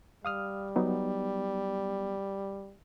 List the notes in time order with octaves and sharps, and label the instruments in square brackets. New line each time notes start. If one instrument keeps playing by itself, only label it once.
[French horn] G3 [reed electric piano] F5 D#6 F6
[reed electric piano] F#3 B3 D#4